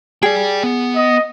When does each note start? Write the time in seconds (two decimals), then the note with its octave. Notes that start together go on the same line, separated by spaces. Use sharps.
0.23 G#4 D5 G5
0.63 B3
0.96 D#5